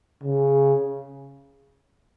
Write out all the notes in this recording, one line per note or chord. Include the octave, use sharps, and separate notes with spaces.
C#3